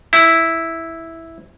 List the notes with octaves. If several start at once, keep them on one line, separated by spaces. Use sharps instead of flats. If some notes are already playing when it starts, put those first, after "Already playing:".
E4